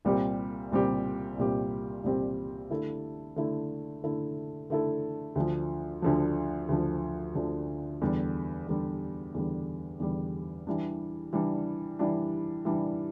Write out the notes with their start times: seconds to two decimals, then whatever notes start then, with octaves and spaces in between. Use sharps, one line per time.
0.05 C2 A#2 G3 C4 G4
0.72 C2 A#2 G3 C4 G4
1.38 C2 A#2 G3 C4 G4
2.04 C2 A#2 G3 C4 G4
2.70 D3 A3 E4 A4
3.36 D3 A3 E4 A4
4.04 D3 A3 E4 A4
4.70 D3 A3 E4 A4
5.35 D2 D3 F3
6.02 D2 D3 F3
6.69 D2 D3 F3
7.35 D2 D3 F3
8.01 E2 D3 G3
8.68 E2 D3 G3
9.34 E2 D3 G3
10.00 E2 D3 G3
10.67 E3 G3 D4
11.33 E3 G3 D4
11.99 E3 G3 D4
12.65 E3 G3 D4